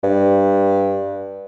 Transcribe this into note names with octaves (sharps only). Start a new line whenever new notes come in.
G2